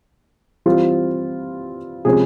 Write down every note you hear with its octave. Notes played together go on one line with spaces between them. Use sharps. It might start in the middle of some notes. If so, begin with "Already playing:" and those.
E3 G3 C4 F4
C3 F3 G#3 C#4 G#4